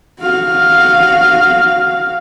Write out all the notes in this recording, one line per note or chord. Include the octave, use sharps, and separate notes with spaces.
F#4 F5